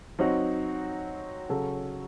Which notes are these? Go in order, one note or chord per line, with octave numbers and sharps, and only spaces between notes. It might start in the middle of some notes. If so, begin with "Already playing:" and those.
F#3 C4 D#4 F#4
C#3 F#3 C#4 F#4 A4